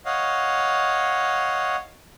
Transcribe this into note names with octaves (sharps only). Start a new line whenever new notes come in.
C#5 D#5 F5 F#5